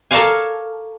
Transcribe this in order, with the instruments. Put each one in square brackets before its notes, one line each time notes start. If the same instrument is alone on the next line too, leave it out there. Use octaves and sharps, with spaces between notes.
[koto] A4 A#4 C#5 D5 F5 G#5